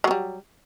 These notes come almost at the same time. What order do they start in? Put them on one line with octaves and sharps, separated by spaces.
F#3 B3 G3